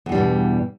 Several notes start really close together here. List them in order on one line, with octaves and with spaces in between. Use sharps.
E2 G2 G3 B2 E3